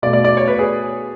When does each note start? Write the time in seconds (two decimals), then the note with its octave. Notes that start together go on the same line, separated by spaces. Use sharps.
0.02 B2 A3 D5
0.13 D5
0.24 D5
0.37 C#5
0.48 B4
0.59 G#4